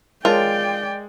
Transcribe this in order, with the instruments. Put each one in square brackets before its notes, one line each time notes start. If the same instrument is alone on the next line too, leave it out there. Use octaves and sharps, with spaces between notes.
[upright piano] G#3 [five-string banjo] F4 [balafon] A#4 C#5 A5 [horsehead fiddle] D5 G5